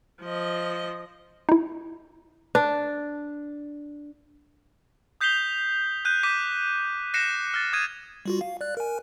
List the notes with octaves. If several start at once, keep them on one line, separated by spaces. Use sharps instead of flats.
F3 D#5
D#4 E4
D4 B4
D#6 G6 B6 C7 F7 G7
F#6 G6 D#7
D6 G6 B6 D#7
F#6 A#6 C7 C#7 E7
F6 A6
D#6 G#6 D#7
G3 F4 F#4
F5
D5 F#6
A#4 G#5